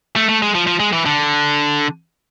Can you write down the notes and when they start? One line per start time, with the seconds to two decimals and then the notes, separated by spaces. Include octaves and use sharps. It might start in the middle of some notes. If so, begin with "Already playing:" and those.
0.16 A3
0.29 A3
0.42 G#3
0.55 F3
0.67 F3
0.80 G#3
0.93 E3
1.05 D3